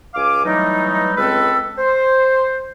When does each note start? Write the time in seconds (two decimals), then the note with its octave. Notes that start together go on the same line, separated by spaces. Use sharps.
0.14 C#2 F5 G#5 D6
0.45 E3 F#3 G3 A3 D#4
1.16 C#2 G#3 C4 A4 B4 E6
1.77 C5